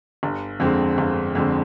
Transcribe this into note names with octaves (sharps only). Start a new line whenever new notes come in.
G1
F2 D3 G#3 C4
G1
F2 D3 G#3 C4